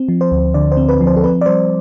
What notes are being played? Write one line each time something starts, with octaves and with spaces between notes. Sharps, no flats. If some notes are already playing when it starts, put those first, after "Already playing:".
Already playing: C4
F3
C5
D2
D3 D5
C5
C4
B4
F3
C5
A4
C4 B4
D5
G3 C5